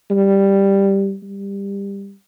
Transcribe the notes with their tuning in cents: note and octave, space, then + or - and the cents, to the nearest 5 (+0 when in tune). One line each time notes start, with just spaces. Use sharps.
G3 +5
G3 +20